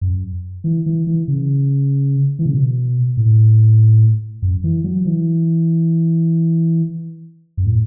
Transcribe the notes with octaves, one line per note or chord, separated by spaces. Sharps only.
F#2
E3
E3
E3
C#3
E3
C#3
B2
A2
F#2
E3
F#3
E3
F#2
A2